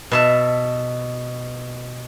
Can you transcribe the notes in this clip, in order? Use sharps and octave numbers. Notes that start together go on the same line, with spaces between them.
B2 E5 A5